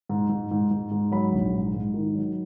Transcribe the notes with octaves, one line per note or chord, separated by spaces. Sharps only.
G#2
G#2
G#2
G#2
G#2
F#3 B5
A#1
G#2
G#2
D#3
F#3